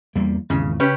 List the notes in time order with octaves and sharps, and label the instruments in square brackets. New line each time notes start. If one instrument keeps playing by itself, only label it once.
[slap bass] E2 G3 A#3
[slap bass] G#1 E2 [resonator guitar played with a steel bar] C#3
[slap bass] C#3 [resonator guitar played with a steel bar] C#4 G4 B4